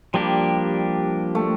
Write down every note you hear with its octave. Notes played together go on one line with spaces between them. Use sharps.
F3 G3 A#3 D4 G4
A3